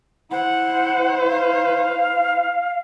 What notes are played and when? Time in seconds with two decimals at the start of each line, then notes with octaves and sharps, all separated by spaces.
0.31 E4 C5 F#5
1.30 F5